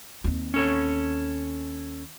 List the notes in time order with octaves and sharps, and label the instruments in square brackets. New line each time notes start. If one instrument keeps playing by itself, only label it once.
[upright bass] D#2 C4
[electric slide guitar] C#4 A4 C#5